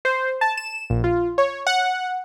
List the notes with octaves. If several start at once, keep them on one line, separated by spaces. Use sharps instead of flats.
C5
A5
E7
A#1
F4
C#5
F#5